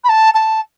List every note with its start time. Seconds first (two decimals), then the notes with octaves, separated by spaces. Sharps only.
0.04 B5
0.09 A5
0.34 A5